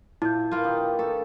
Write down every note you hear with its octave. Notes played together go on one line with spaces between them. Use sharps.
A#2 E4 G6
A#3 F4 A#4 B4
D#3 D#4 G4
A3 D4 F4 A4